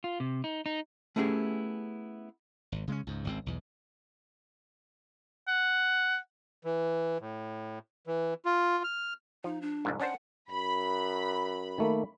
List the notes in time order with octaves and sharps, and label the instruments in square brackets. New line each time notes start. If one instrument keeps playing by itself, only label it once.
[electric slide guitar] F4
C3
D#4
D#4
[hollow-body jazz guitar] A3 B3 C#4 E4 G4 G#4
[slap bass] G#1
C#3 G#3 B3 C#4
C#2 G#2
G#1 C#2 C4
B1 E2
[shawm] F#5
[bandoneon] E3
A2
E3
F4
F6
[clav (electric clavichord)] F3 [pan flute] D#4
[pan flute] D4
[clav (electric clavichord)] C2 F2 G#2
[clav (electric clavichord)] C#4 D4 C5 [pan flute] F#5
[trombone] F#2 [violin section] B5
[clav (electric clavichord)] D#3 A3 A#3